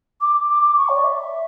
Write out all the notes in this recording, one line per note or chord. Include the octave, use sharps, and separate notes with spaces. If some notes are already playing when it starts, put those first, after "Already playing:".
D6
D6
D6
C#6
C#5
D5
E5